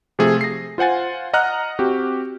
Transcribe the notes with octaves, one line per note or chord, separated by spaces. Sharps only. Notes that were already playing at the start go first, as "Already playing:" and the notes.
C3 F3 A3 F4 G#4 A4
A#6 C7
F4 C5 F#5 G#5 A6
D#5 F#5 A#5 F6 F#6
C4 F#4 G4